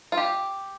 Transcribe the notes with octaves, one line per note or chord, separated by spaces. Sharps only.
F4
G4